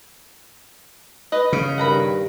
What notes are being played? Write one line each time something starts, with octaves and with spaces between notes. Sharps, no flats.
B4 D#5
C#3
G2 D#3 F#5 A#5 B5